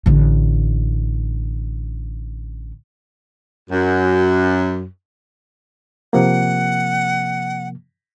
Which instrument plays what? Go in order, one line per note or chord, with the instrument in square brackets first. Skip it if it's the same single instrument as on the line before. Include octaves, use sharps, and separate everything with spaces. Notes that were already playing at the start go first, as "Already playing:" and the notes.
[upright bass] A1 D3
[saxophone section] F#2
[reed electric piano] C3 F3 A#3 [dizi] F#5